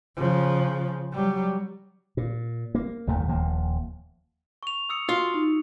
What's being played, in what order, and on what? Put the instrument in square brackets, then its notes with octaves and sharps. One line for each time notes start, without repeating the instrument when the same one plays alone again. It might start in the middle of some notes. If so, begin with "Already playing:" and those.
[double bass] C#3 F3
F#3 G3
[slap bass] A#2
A#3
F#1 D#2 D#3 A3
D#1 D#2 F3 A#3
[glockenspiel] C#6 F7
D#6 E6 C#7
[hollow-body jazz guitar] F4 [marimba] F#4
[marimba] D#4